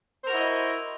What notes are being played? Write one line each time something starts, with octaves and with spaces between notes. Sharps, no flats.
E4 F#4 A#4 C5 D#5